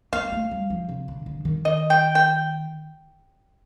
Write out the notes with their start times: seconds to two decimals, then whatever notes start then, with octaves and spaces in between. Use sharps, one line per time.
0.13 A#3 F5
0.32 A3
0.51 G3
0.70 F3
0.89 C3
1.08 D3
1.26 D3
1.45 D#3
1.65 D#5
1.90 G5
2.15 G5